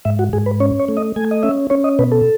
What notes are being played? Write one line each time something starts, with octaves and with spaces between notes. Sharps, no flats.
G#2 E5
F#4
G#2 G#4
B4
C#4 C#5
C#5
A3
D#5
A3 G#5
D#5
C#4 E5
C#4 C#5
D#5
B2 B4
A4